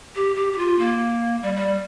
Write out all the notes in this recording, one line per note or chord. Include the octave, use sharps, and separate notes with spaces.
G4
G4
G4
F4
A#3
G3
G3